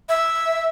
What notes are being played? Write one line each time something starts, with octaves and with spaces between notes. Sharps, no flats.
E5